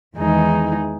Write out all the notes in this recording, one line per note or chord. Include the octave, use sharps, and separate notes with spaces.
E2 D#3 G#3 D#4 G#4